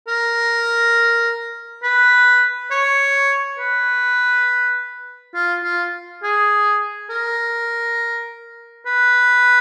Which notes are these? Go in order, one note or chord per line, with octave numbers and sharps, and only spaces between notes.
A#4
B4
C#5
B4
F4
F4
G#4
A#4
B4